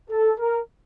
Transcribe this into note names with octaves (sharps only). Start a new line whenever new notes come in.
A4
A#4